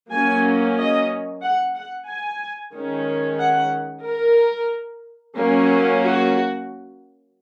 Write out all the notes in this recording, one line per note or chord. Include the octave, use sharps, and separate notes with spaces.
F#3 A#3 C#4 G#5
D#5
F#5
F#5
G#5
D#3 G#3 C#4
F#5
A#4
F#3 A#3 C#4
F#4